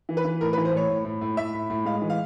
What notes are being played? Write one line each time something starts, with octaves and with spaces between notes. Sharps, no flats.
E3
B4
E3
A2 A#4
B4
E3
C5
A2 C#5
A2
A2
A2
A2 E5
A2
A2
G#3 F5
E3
F5